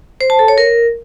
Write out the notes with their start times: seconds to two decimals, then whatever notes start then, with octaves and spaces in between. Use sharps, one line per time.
0.21 C5
0.30 A5
0.39 A4
0.48 C#5
0.58 A#4